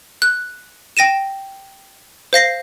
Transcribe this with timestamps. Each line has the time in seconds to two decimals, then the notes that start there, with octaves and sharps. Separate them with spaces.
0.22 F#6
0.97 G5 A#6 D#7 E7
2.33 C5 F5 A#6 C7